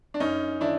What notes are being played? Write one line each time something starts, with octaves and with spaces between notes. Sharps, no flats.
D4
F#2 C#4 D#4
D#3 D4 E4